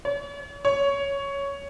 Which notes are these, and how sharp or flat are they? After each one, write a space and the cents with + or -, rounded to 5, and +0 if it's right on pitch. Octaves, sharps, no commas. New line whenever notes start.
C#5 +45
C#5 +10